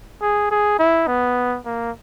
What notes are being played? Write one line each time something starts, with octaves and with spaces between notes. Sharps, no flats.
G#4
G#4
E4
B3
A#3